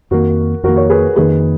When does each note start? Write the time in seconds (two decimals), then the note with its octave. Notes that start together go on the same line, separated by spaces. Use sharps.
0.11 F2 D#3 A#3 F#4 A#4
0.63 F2 D#3 A#3 F#4 A#4
0.77 A#4 C#5
0.90 G#4 B4
1.16 F2 D#3 A#3 G#4 B4